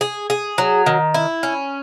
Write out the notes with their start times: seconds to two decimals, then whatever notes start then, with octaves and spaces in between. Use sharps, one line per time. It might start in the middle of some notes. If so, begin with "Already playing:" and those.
0.01 G#4
0.30 G#4
0.58 F#3
0.86 D#3
1.14 E4
1.43 C#4